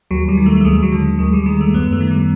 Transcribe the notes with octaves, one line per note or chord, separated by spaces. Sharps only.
D#2 F#3
G3
D#3
A3
A3
D#2 G#3
F#3
D3
D#2 G#3
G3
D#3 G#3
A3
F#2 B3
A3
D#3
G3